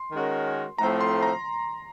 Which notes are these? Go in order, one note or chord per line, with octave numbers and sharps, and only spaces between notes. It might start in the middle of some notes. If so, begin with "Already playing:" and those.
Already playing: C6
D#3 G#3 C#4 F#4 A#4
A2 F3 A3 C4 A#5
C6
A#5